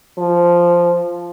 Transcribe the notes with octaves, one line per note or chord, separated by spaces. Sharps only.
F3